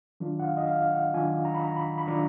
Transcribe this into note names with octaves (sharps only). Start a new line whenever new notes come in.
D#3 F#3 D4 F4
F#5
F5
D#5
F5
F5
F#5
D#3 F#3 D4 F4 G#5
A#5
B5
A#5
B5
B5
D#3 F#3 D4 F4 A#5